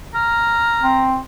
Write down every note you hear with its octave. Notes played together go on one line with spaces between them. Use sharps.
A#5 F6
C4